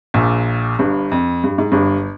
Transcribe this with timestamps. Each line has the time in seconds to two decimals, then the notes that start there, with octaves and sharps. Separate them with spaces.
0.14 A#1 A#2
0.79 G1 G2
1.12 F2
1.44 G2
1.58 G#2
1.72 G1 G2